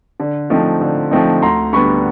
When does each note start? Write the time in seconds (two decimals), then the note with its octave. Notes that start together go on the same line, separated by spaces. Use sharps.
0.20 D3
0.50 F3 A3 C4 D#4
0.81 D3
1.11 F3 A3 C4 D#4
1.42 D2 A#5 C6
1.73 D3 G3 B3 D4 B5 C#6